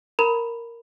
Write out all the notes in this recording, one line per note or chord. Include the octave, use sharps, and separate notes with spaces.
A#4 A#5 B5